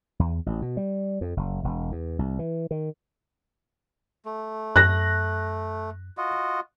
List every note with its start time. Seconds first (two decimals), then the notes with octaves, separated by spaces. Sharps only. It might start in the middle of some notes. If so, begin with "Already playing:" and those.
0.19 E2
0.46 A1
0.62 B2
0.77 G3
1.21 F2
1.37 F#1
1.64 E1
1.92 E2
2.19 C2
2.39 E3
2.71 D#3
4.25 A3
4.76 F#2 F#6 A#6
6.18 F4 F#4 D#5